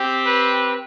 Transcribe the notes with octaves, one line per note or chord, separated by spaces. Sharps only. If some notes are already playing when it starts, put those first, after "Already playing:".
Already playing: C4 G4
B4